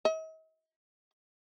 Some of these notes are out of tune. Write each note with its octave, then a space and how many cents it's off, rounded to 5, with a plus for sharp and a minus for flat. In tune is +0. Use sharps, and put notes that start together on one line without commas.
D#5 +45